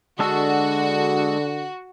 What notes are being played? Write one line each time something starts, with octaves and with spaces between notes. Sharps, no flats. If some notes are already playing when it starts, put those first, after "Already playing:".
D3 G#3 D4 F#4 A4